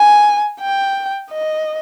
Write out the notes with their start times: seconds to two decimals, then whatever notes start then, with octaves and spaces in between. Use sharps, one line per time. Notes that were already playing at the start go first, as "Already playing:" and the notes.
Already playing: G#5
0.61 G5
1.31 D#5